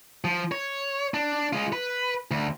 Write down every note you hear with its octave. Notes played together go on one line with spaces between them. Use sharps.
F3
C#5
D4
G#3 F4
B4
D2